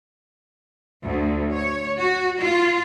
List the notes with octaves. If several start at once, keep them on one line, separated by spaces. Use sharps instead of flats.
D2
C#5
F#4
F4